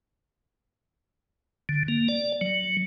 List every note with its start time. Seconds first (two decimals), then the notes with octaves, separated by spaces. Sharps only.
1.69 D3
1.88 A#3
2.09 D5
2.41 F#3